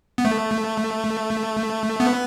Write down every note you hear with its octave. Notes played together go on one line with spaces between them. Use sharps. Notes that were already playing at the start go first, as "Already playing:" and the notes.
B3
A3
B3